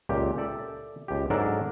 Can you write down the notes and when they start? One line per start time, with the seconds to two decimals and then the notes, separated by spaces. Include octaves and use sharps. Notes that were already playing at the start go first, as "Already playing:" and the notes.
0.09 C#2 A#2 G4
0.38 A4 D5 E5
1.08 C#2 G4
1.30 G#2 F#3 D4 A4 A#4 D5